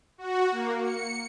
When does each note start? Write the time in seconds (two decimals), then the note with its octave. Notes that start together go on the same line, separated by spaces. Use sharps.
0.18 F#4
0.52 A#3
0.82 C#7